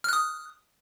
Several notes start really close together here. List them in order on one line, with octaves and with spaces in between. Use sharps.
F6 F#6 D#6